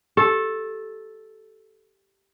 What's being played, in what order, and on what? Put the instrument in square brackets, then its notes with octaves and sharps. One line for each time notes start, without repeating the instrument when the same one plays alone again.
[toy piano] G4 [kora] A4